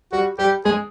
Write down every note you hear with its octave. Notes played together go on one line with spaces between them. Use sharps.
G3 F#4
G3 G4
G#3 G#4